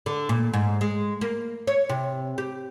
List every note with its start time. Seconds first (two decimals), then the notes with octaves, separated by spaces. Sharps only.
0.06 D3
0.29 A#2
0.53 G#2
0.81 G#3
1.21 A#3
1.67 C#5
1.89 C3
2.38 G4